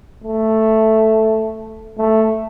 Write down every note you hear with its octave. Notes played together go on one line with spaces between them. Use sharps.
A3
A3